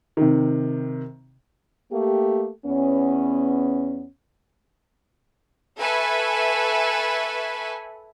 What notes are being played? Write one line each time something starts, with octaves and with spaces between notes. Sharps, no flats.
C3 D#3
A3 A#3 G4
E2 B3 C#4
A4 B4 E5 G#5 B5 C#6